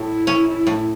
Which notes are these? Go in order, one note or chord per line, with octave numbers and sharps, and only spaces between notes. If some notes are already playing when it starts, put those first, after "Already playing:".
Already playing: A2 E4
C#4
A2